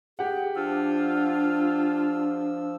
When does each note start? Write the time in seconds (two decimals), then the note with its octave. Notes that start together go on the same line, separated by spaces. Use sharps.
0.19 G4 G#4 F#5
0.56 F3 D4 F4 E6